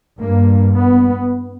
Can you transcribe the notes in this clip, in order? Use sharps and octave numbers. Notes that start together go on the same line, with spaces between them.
G2 A#3
B3